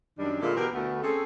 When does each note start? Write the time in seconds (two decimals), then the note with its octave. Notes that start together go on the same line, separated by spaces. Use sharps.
0.18 F#2 D#3 G3 D4
0.41 A#2 D3 G#3 A#3 E4 F4
0.55 B2 E3 G4 A#4
0.73 D2 A3 B3
1.01 C4 C#4 G#4 A4